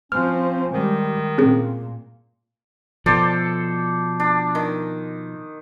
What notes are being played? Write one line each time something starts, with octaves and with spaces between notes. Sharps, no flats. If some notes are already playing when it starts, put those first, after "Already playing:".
F3 C4 C#4 F6
D#3 G3 G#3
A#2 C4 C#4 G#4
B2 F3 A4 C5 D5
D4
D#3